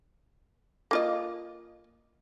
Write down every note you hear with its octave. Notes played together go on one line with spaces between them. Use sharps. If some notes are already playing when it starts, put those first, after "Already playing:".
A#3 F4 D#5